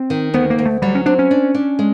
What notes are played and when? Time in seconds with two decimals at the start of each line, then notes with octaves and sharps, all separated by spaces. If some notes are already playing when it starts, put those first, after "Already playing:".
Already playing: C4
0.10 D#3
0.34 D2 B3
0.50 A#3
0.58 D2
0.66 A3
0.82 F#3 G3
0.95 C#4
1.06 C4 D4
1.19 C#4
1.31 D4
1.55 D4
1.79 G#3